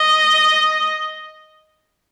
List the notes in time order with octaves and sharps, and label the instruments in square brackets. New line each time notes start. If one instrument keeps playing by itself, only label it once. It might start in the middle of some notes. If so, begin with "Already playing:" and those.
Already playing: [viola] D#5